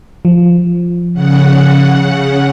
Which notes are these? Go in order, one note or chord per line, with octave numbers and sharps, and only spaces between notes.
F3
C#3 F#5